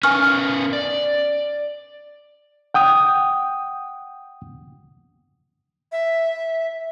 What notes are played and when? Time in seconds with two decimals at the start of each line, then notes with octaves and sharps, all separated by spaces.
0.03 C#4 A#4 B4 G#5 C#6 F6
0.73 D5
2.74 F#5 G5 D#6
5.92 E5